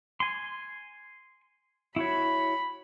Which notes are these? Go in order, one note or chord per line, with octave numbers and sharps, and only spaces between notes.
G#5 C6
E4 F#4 C#5 B5